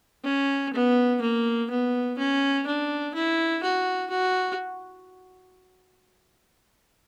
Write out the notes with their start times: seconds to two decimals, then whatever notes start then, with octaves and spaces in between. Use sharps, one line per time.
0.24 C#4
0.74 B3
1.21 A#3
1.70 B3
2.18 C#4
2.67 D4
3.14 E4
3.63 F#4
4.10 F#4